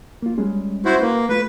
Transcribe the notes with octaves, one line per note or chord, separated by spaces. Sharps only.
A#3 F4
G3 G#3 C#4
E4 F#4 C5
A#3 B4
A3 F4 B4